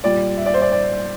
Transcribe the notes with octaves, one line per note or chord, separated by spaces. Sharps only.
A#2 G3 D5
E5
D5
C5
D5
D5